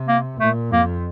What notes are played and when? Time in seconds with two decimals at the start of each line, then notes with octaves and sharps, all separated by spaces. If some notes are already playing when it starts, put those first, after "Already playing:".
Already playing: C3
0.08 A#3
0.40 A#2 A3
0.72 F2 A#3